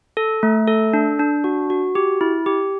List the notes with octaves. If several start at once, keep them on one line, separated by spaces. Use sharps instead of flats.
A4
A3
A4
D4
D4
F#4
F#4
G4
E4
G4